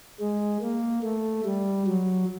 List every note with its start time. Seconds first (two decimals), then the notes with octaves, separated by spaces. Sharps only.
0.20 G#3
0.61 A#3
1.03 A3
1.45 G3
1.87 F#3